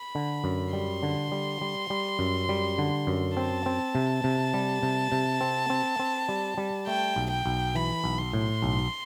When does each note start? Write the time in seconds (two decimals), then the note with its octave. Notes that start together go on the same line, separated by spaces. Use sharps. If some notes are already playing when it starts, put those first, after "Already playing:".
Already playing: B5
0.15 D3
0.44 F#2
0.73 G3 C6
1.03 D3
1.32 G3
1.61 G3
1.90 G3
2.19 F#2
2.49 G3
2.78 D3
3.07 F#2
3.37 C4 A5
3.66 C4
3.95 C3
4.24 C3
4.54 G3
4.83 C3
5.12 C3
5.41 C4
5.70 C4
5.99 C4
6.29 G3
6.58 G3
6.87 A3 G5
7.16 B1
7.31 G5
7.46 B1
7.75 E3 B5
8.04 B1
8.18 C6
8.33 A2
8.62 B1